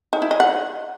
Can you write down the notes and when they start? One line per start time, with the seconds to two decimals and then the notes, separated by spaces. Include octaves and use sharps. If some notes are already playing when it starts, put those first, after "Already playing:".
0.13 D#4
0.22 E4
0.31 D#5
0.40 F#5